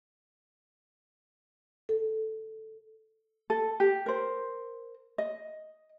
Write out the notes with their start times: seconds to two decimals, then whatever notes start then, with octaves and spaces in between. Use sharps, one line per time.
1.89 A4
3.50 A4
3.80 G4
4.06 A#4 C5
5.18 D#5